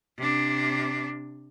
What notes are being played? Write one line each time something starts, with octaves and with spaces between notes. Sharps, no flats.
C3 D4